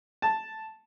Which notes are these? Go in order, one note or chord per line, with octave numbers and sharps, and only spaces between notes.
A5